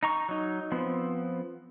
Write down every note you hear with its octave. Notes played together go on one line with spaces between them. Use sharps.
D#4 A#5 C#6
F#3 D#4
F3 B3 C4